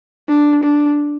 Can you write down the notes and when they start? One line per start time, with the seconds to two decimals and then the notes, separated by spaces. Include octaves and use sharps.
0.29 D4
0.64 D4